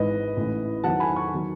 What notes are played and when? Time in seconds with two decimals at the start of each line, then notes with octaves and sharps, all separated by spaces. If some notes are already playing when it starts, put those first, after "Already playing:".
Already playing: G#1 G#2 E3 B4 D#5
0.37 A1 A2 E3
0.84 E2 D#3 F#3 F#5 A5
1.00 G#5 B5
1.16 A5 C#6
1.34 D#3 F#3